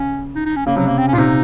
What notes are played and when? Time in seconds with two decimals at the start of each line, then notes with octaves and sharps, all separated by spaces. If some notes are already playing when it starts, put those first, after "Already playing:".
Already playing: C#3 C#4
0.35 D#4
0.46 D#4
0.56 C#4
0.66 C#3 A#3
0.76 C3 F#3
0.87 A#3
0.98 C4
1.08 C#4
1.13 A#2 F4
1.18 C3 D#4